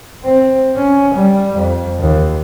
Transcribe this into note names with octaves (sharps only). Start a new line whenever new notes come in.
C4
C#4
G3
F2
D#2